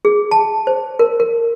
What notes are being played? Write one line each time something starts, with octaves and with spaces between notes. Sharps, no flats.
G#4
A5
C5
A#4
A#4